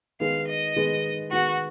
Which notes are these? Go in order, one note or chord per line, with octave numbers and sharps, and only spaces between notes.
D#3 G#3 B3 F5
D#5
D#3 G#3 B3
D#3 G#3 B3 F#4